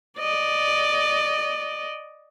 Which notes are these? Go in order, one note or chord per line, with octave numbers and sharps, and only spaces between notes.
D5 D#5